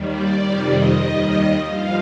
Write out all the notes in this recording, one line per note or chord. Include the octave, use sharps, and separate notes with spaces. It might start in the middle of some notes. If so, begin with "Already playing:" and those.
Already playing: D#2 D#3 G3
D5
F2 C3 D#3 G3
D#5
D#2 D#3 G3
G2 F3 F5